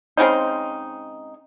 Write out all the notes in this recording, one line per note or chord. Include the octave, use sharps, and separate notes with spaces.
C#3 G#3 C4 D#4